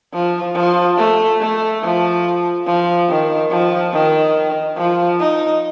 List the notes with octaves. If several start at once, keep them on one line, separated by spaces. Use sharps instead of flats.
F3
F3
A3
A3
F3
F3
D#3
F3
D#3
F3
D#4